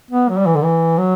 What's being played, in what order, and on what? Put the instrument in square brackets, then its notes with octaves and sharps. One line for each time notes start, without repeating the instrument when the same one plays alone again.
[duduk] B3
F#3
G3
E3
D3
E3
F#3